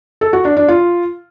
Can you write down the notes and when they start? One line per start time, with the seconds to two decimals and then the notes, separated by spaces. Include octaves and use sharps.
0.21 A4
0.33 F#4
0.45 D4
0.57 D4
0.68 F4